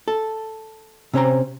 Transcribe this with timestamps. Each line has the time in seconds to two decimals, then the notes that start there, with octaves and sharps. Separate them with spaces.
0.08 A4
1.13 C3 C#4 C5 A#5